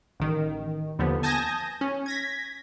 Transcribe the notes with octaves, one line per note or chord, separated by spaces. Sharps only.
A1 D#3
D#2 D3 F3 B3
G#5 A5 D#6 G6 G#6 A#6
C#4
G#6 A#6 B6